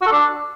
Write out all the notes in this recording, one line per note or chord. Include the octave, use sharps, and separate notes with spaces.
F#4
A4
D4